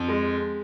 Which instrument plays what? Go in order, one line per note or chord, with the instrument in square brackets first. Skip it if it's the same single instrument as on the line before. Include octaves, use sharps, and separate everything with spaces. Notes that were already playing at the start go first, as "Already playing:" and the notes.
Already playing: [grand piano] F2
G#3